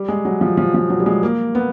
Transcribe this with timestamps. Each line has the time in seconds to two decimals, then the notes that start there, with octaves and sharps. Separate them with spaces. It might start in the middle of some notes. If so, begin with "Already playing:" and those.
Already playing: G3
0.08 G#3
0.25 F#3
0.41 F3
0.57 F3
0.74 F3
0.90 F#3
1.00 G3
1.06 G#3
1.23 A#3
1.55 B3